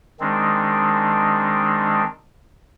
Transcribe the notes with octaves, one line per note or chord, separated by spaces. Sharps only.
D#3 G#3 C4 D4